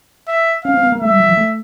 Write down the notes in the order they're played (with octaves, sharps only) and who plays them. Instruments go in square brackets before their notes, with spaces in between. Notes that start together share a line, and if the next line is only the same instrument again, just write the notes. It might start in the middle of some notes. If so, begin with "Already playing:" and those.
[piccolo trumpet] E5
[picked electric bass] C#4 [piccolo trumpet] F5
[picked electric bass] C4
B3
A#3
[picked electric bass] A3 [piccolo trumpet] E5
[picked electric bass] G3
F#3
F3
A3